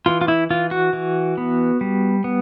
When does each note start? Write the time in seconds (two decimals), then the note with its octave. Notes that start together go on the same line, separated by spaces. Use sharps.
0.06 E3 F4
0.21 F4
0.28 E4
0.50 E3 F4
0.71 F#4
0.93 E3
1.37 B3
1.81 G3
2.24 B3